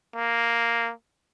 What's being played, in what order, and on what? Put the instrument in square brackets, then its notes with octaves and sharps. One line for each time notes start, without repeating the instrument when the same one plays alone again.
[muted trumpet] A#3